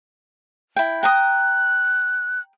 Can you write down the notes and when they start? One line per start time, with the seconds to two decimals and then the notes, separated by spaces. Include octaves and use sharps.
0.76 E4 G5
1.03 G5 A#5 D#6 F#6